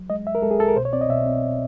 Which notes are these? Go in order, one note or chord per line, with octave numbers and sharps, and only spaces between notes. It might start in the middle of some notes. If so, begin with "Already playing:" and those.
Already playing: F#3
G#3 D#5
C2 E5
A#4
G#3 A4
G#4
C2 A4
A#4
B2 C5
C#5
C4 D5
D#5
B2 E5
C4